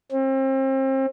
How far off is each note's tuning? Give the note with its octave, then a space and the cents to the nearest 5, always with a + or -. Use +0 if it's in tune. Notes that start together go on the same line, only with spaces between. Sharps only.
C4 +35